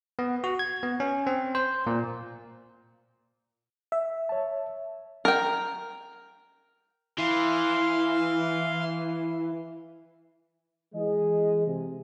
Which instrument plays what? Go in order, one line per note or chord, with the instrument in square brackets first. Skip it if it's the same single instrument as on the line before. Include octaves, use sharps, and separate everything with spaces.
[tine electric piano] B3
F#4
G#6
B3
C#4
C4
C5
A#2
[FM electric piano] E5
[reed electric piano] C#5 A5
[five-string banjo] A#4 G5
[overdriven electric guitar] E3 [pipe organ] F5 C6
[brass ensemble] E3 G#4 D#5 [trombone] G#3
[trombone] C3